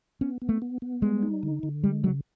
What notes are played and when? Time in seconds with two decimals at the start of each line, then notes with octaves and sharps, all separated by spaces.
0.21 B3 C#4
0.42 B3
0.49 A3
0.62 B3
0.82 B3
1.02 G3 G#3
1.23 D#4
1.43 D3
1.63 D3
1.84 G3 G#3
2.04 C#3 F#3